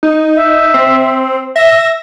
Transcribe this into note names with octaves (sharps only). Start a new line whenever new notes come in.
D#4
E5
C4
E5 A#6